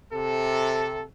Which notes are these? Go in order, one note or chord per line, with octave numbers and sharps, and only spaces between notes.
C3 A4